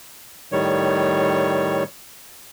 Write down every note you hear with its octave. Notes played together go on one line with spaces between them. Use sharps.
A2 D#3 G3 C#5